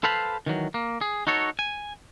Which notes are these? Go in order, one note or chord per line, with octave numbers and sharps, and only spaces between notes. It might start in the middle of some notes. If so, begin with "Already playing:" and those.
A4 B4 C5 F5 A5 B5
D#3 E3 F#3
A#3
G#4
D#4 F#4 A4 C#5
G#5